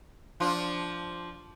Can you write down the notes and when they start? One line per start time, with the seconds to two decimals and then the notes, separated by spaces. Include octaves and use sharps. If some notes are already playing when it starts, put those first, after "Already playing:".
0.40 F3 D4 F4